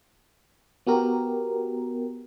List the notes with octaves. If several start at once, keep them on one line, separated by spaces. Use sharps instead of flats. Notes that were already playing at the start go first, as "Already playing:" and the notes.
B3 F#4 G4 A#4